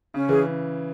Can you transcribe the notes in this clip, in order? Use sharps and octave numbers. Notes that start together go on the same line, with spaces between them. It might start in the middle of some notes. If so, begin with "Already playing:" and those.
C#3 C#4
E3 G#4